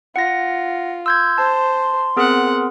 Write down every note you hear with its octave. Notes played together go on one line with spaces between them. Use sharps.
F4 F#5 A#6
C6 E6 G6 G#6
C5 A5
B3 C4 G#4 A#4 F#5